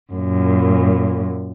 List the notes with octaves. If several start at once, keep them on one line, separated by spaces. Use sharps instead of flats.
F#2 A#2